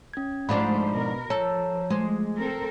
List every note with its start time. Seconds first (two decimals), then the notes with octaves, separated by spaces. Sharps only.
0.13 C#4 G#6
0.49 G#2 F3 A3 D4 C5 B5
0.93 B2 A#4
1.30 F3 A4 C#5 A#5
1.90 G#3 A3 C5
2.37 C4 A4 A#4